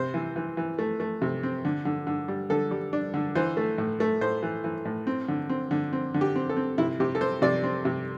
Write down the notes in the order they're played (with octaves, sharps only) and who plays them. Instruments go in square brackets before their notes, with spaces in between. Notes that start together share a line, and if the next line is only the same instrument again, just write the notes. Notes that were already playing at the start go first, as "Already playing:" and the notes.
Already playing: [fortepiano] C3 C5
E3
E3
E3
A3
A3
C3
C4
D3
D3
D3
G3
D3 A4
G3
D4
D3
E3 C5
A3
A2
A3
A2 C5
E3
E3
A2
C4
D3
C4
D3
C4
D3
G4
C4
A4
C4
C3 E4
C3 G4
A4
C4 C5
C3 D5
C4
C3